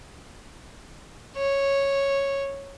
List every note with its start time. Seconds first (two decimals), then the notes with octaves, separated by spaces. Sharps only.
1.36 C#5